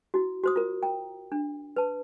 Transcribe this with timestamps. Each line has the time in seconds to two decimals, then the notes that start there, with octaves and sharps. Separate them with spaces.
0.14 E4 F#4
0.44 F#4 C5 D#6
0.56 F4 A#4
0.83 G5 A#5
1.32 D4
1.76 B4 A5